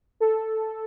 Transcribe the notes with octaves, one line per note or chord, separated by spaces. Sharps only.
A4